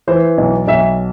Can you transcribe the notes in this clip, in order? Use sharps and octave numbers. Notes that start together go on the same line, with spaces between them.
E3 C5
B1
B1 E5